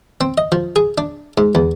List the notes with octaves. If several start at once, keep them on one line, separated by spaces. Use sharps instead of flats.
C4
D#5
F3
G#4
D4
G#2
E2